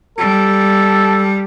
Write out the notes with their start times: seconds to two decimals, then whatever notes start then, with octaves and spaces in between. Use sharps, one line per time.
0.18 G3 A4